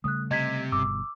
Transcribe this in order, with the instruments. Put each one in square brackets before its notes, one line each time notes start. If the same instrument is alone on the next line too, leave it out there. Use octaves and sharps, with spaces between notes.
[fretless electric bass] C#3 G3 A3 [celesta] D#6 F#6
[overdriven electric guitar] C3 [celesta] D#5 G#6 B6
[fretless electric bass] G1 G2 B2 [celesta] D6 E6